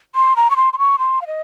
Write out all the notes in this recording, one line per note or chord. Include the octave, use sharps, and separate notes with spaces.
C6
A#5
C#6
C6
C6
C#6
C6
F5
D#5